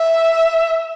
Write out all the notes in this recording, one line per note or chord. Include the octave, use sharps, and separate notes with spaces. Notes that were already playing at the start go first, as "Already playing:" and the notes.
Already playing: E5